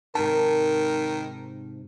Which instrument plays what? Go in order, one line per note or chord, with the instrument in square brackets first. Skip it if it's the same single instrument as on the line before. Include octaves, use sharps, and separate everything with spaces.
[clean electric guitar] G#2 C3 A5 [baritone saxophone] D#3 [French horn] A#4